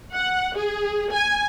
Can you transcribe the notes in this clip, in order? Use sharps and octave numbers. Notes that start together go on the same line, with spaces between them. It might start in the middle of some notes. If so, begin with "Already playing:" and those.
F#5
G#4
G#5